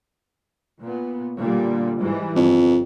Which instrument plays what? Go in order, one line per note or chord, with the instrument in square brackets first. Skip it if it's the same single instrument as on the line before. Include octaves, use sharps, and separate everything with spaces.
[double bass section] A#2 B3
A#2 D3 G3
G#2 E3 G3
[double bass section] G1 [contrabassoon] F2